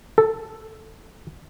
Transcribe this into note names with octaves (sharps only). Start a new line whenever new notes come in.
A4